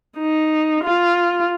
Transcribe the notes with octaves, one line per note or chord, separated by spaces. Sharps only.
D#4
F4